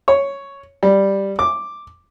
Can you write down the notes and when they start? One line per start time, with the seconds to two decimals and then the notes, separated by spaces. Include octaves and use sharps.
0.08 C#5
0.83 G3
1.39 D6